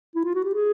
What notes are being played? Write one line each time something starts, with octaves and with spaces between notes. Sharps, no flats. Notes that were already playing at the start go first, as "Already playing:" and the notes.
E4
F4
F#4
G4
G#4